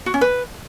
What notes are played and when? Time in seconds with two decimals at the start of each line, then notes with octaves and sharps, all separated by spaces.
0.06 F#4
0.14 C#4
0.21 B4